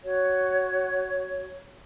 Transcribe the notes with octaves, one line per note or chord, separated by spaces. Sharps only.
F#4 C#5